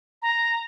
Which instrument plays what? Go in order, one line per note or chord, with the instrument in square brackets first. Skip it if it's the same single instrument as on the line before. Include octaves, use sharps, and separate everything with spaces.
[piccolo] A#5